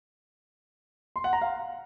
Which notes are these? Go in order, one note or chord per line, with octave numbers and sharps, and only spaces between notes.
C6
F#5
A#5
F5